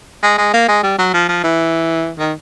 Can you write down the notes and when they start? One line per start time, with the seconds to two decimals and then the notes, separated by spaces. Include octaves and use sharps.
0.23 G#3
0.38 G#3
0.54 A#3
0.68 G#3
0.83 G3
0.98 F#3
1.13 F3
1.29 F3
1.44 E3
2.19 D#3